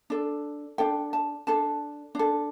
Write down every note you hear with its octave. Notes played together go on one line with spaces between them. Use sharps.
D4 A4
D4 A4 G5
A5
D4 A4 A5
D4 A4